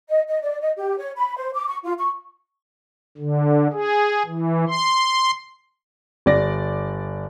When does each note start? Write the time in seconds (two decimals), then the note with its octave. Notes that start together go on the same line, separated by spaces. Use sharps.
0.09 D#5
0.28 D#5
0.42 D5
0.61 D#5
0.76 G4
0.98 C#5
1.16 B5
1.36 C5
1.54 D6
1.67 C#6
1.84 F4
1.98 C#6
3.18 D3
3.73 G#4
4.25 E3
4.68 C6
6.26 G1 D5 A#6